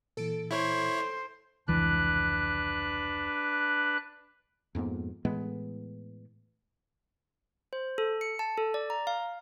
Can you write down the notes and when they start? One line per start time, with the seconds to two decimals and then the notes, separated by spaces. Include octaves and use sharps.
0.17 A#2 E3 A4 D7
0.51 E4 C5 C#5
1.68 F1 C#2 E3 D4 B4 F#6
4.75 F2 G#2 A#3 B3
5.25 A2 E3 G#3 B3
7.73 C5
7.98 A4
8.21 C#7
8.39 A5
8.57 A4
8.74 D5
8.90 A#5
9.07 F5